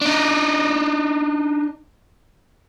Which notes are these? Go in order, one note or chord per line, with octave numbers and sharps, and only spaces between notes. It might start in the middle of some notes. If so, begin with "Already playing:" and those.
D4 D#4